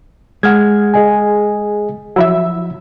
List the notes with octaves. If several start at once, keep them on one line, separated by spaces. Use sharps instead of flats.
G#3 F#5 F6 G#6
G#4 D#5 G#5
F3 F#3 E4 E5 E6